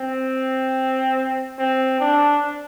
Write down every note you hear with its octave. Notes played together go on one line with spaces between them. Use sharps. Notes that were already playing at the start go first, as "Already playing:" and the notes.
Already playing: C4
C4
D4